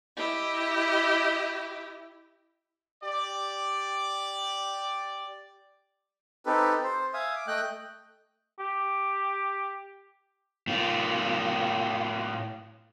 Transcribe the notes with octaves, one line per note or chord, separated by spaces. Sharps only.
E4 G4 D#5
G4 D5
C4 D#4 G4 A4 B4
C5
E5 F5 G#5 D#6
D6
A3 D#5 G5 F#6
G4
A2 F4